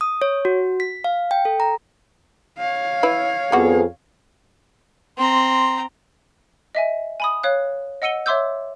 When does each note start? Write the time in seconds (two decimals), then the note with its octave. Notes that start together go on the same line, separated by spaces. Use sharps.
0.01 D#6
0.22 C#5
0.45 F#4
0.80 B6
1.04 F5
1.31 G5
1.45 A4
1.60 A#5
2.58 C#5 F5
3.03 E4 B4
3.52 F2 G3 B3 F#4 G#4
5.18 C4 A#5 C6
6.75 D#5 E5 G#5
7.20 G#5 B5 D#6
7.43 C#5 F5 F#6
8.02 D#5 F#5 E6 C#7 D#7 G7
8.26 C#5 E5 C6 D6 E6 G6